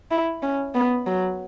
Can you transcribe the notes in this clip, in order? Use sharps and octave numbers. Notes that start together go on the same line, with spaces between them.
E4
C#4
B3
F#3